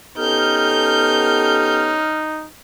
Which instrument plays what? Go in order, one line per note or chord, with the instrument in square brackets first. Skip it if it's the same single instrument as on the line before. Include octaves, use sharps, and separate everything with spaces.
[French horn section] B3 G4 A4 [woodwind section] C#4 F6 [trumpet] D#4 [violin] G6